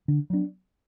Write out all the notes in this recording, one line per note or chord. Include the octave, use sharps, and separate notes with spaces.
D3
F#3 B3 D4